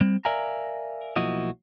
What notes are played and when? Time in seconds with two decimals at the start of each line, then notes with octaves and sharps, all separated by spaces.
0.01 G3 C4
0.25 A#4 D5 E5 F5 G#5 A#5
1.16 B1 F3 A#3 E4 F#4 D#5